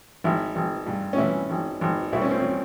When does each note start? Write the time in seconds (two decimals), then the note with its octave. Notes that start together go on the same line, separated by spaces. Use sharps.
0.24 G#1 E4
0.56 G#1
0.87 G2
1.13 C#4
1.18 E3 E4
1.50 G#1
1.81 G#1
2.13 C2 E4
2.22 C#4
2.31 C4
2.40 C#4